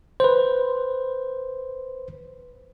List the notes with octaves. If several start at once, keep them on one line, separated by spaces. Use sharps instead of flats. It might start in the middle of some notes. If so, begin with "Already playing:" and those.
B4 C5